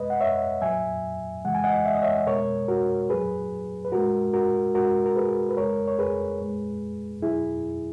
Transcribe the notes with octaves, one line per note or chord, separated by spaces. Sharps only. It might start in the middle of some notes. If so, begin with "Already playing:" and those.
Already playing: B2 G#3 B4 D#5
F#5
C#5 E5
A#2 F#3 E5 G#5
C#3 E3 G#3 F#5
G#5
D#5 F#5
E5
D#5
C#5 E5
B2 G#3 A#4 C#5
F#4 A#4
A#2 F#3 G#4 B4
B4
A#2 G#3 F#4 A#4
F#4 A#4
B2 G#3 F#4 A#4
A#4
G#4 B4
B4
C#3 G#3 A#4 C#5
C#5
G#4 B4
A#2 G#3
B2 F#3 E4 G#4